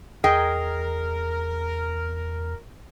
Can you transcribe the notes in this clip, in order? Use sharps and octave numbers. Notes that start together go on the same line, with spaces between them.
E2 G#4 A#4 D#5 G5